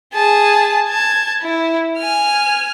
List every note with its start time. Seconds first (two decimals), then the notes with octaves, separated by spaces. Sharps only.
0.13 G#4 A5
0.88 A5 G#6
1.42 E4
1.98 G#5 F6